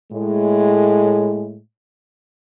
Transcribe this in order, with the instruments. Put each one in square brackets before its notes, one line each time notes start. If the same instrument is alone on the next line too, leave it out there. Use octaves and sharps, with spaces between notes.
[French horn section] A2 G#3